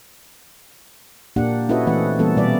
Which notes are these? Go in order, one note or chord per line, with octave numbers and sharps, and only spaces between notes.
A#2 A#3 D4 G4 F#5
C#4 E4 F#4 A4 B4 D#5
E3 A3 C4 B4 F#5
E3 G3 A#3 B3 C#4 A4
B2 G3 B4 D5 E5